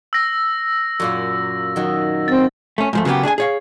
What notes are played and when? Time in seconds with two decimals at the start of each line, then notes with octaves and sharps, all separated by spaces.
0.13 E6 A#6
1.00 F#2 A#2 A#3
1.76 D#3 F#3
2.28 C4 A6
2.78 A3 C#4
2.93 G#2 F3 A3
3.05 C#3 F#3 A#3 B3 G4
3.23 D4 G#4 D5 G#5
3.38 G#4 C#5 F5